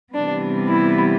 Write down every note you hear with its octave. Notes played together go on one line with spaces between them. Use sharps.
C3 E3 G3 B3 D4
E4